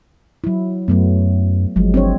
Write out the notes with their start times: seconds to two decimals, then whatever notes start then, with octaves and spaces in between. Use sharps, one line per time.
0.44 F#3 E4
0.88 F#2 F#3 A3 B3
1.76 G1 F3 F#3 G#3
1.94 C4 D4 C#5